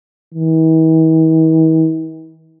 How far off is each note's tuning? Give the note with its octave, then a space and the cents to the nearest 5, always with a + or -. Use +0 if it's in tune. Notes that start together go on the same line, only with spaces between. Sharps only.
E3 -45